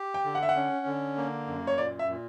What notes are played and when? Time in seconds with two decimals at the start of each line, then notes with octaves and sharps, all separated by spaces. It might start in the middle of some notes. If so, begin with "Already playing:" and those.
Already playing: G4
0.14 G5
0.24 D3
0.35 F#5
0.43 E5
0.49 F#5
0.56 C#4
0.86 D3
1.17 A#3
1.47 F#2
1.67 C#5
1.78 A#2 D5
1.99 E5
2.09 A#2